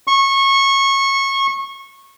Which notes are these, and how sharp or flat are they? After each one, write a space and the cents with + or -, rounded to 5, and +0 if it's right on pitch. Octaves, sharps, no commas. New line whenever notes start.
C#6 -20